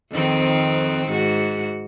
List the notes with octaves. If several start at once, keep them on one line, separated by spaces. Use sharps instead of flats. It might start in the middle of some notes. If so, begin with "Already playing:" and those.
F2 D#3 C4
G#2 F#4